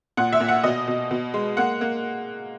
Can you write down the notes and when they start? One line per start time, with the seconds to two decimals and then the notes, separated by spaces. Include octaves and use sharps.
0.17 A#2 F#5
0.32 E5
0.40 A#2
0.48 F#5
0.64 B2 D#5
0.88 B2
1.11 B2
1.34 G#3
1.57 A#3 F#5
1.81 A#3